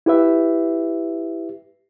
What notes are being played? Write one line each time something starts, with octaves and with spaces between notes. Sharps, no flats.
E4 G4 B4 E5